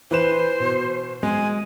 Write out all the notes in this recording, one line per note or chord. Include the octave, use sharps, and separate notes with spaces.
E3 B4 C5 E7
B2
G#3 G#5